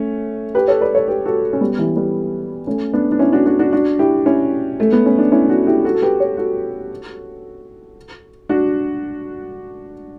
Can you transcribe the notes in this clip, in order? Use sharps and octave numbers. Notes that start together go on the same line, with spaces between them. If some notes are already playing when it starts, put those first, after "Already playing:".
Already playing: A3 C#4
G4 B4
A4 C#5
B4 D5
A4 C#5
G4 B4
F#4 A4
C#4
G3 B3
E3 G3
G3 B3
A3 C#4
B3 D4
D4
C#4 E4
D4 F#4
D4 F#4
D4 F#4
D4 F#4
E4 G4
C#4 E4
A3
B3
C#4
D4
C#4 E4
D4 F#4
E4 G4
F#4 A4
A4
G4 B4
A4 C#5
F#4 A4
D4 F#4